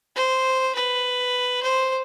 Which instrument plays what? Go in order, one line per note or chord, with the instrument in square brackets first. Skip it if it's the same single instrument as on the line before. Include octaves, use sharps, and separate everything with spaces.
[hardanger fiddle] C5
B4
C5